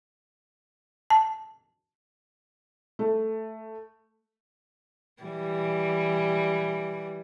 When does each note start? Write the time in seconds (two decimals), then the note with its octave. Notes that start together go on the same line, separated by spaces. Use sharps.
1.10 A5
2.99 A3
5.23 E3 G3